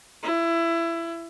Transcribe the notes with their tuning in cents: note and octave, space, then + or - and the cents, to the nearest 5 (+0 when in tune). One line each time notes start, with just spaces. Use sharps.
E4 +20